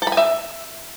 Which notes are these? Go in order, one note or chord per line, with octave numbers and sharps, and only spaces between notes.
A4
B5
G#5
E5